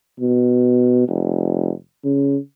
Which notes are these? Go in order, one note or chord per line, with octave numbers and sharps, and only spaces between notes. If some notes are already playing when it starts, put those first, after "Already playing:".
B2
F1
C#3